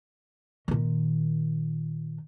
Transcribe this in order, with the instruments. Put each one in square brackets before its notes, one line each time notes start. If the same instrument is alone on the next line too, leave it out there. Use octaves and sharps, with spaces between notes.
[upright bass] A#2 D#3